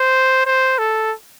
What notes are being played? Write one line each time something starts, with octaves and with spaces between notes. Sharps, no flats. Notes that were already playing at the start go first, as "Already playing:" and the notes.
Already playing: C5
C5
A4